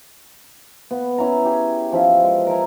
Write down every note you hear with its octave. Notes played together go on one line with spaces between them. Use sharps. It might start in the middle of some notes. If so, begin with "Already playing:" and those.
B3
C#4 E4 A#5
G4 G#4
F3 C#4 E5
G#3
A#4 E5 G#5 A#5